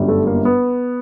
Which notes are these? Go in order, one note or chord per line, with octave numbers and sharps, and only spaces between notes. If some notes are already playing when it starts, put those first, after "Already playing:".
Already playing: G1 F#2 D3 G3
A3
A#3
B3